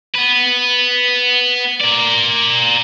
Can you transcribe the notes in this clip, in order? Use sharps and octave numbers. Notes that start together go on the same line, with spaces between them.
B3 B4
A#4 D5